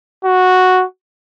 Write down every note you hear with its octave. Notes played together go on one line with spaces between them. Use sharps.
F#4